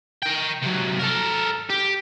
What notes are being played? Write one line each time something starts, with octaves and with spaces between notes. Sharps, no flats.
A#4 G5
C3 F#3
A4 A#4
G4